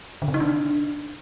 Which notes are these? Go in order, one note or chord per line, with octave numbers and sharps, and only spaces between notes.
D3
C3
D#4
D4